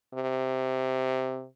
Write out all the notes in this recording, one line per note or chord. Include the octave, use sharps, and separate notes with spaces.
C3